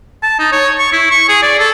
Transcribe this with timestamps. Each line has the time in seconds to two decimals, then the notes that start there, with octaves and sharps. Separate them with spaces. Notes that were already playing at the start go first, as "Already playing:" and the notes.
0.23 A5
0.39 D#4
0.52 C#5
0.78 C#6
0.92 E4
1.11 C#6
1.28 G#4
1.42 D5
1.59 A4